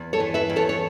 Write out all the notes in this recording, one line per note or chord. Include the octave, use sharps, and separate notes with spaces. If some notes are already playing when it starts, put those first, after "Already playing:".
Already playing: E2
A4 C#5
E3
B4 E5
E2
A4 C#5
C#5